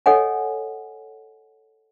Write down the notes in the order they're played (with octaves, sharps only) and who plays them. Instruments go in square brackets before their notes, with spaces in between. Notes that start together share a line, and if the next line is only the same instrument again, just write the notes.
[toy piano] A4 C#5 D#5 F#5 G#5